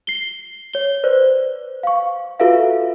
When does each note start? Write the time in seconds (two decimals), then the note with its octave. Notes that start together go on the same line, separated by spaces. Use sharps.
0.07 C7 G7
0.73 C#5 G7
1.04 B4 C5 D5
1.83 F5 C#6
2.40 F4 F#4 A4 B4 E5 F5